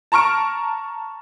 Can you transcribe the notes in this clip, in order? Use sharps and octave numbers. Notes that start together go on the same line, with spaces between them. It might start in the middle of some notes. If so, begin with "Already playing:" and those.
A5 A#5 C#6 F6 D7